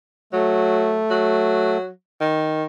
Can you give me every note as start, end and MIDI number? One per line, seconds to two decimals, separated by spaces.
0.33 1.01 54
0.33 1.78 57
1.10 1.89 54
2.21 2.65 51